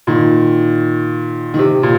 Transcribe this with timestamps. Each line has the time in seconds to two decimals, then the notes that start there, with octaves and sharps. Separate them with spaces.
0.07 A#2 D#3
1.54 D#3
1.59 C3
1.83 A#2